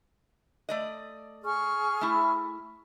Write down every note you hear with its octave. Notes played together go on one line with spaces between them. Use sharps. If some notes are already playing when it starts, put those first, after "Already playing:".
A3 D5 D#5
G#4 C#6 F6
A3 E4